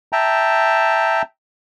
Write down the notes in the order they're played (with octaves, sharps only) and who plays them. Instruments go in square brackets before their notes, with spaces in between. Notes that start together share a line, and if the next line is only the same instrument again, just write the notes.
[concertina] E5 G5 A5 A#5